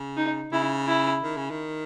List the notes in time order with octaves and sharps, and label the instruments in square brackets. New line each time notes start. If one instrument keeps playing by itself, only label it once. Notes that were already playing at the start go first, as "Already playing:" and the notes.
Already playing: [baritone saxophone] C#3
[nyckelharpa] D#4
[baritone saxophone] C#3 [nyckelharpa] E4
[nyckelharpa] E4
[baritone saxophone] D#3
C#3
D#3